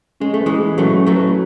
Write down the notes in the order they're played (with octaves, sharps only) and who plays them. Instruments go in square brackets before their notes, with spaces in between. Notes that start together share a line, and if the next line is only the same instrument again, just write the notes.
[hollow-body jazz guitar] G#3 [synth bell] C#4
[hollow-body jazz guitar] A3
[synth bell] B4
[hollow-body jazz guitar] E3 G#3
[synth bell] E4
[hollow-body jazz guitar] F#3 A3 [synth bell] C#4
[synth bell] C#4
[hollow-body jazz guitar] F#3 A3
[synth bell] B4